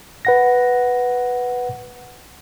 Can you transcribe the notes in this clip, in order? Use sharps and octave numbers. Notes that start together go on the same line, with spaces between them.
B4 F#5 A#6